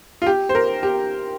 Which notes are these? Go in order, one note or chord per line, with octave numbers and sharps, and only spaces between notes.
F4
G4
C5
A#4
G4